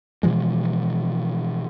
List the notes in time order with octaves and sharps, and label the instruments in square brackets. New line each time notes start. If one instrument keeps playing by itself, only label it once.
[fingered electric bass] B2 E3 F3 G#3